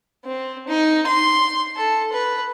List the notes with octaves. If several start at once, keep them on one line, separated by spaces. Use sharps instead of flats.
C4
D#4
C6
A4
B4